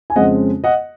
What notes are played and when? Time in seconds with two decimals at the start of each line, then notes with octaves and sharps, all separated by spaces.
0.10 G#5
0.16 F2 C#3 G#3 C4 D#5 F#5
0.64 D#5 F#5